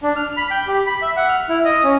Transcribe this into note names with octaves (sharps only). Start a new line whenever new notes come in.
D4
F6
B5
G5
G4
B5
E5
F#5
F6
E4
D#5
C#4